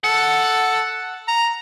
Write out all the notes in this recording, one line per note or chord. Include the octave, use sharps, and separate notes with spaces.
A4 F#5
A#5